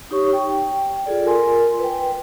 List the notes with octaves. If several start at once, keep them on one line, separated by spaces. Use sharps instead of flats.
D#4 G4 C#5 C#6
G5
F4 G#4 A4 D5
F4 A#4 G#5 C6
B4 G5